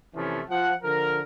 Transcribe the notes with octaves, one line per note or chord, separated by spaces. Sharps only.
C3 E3 F3 A3 C#4
F3 F#5
D3 F3 A#4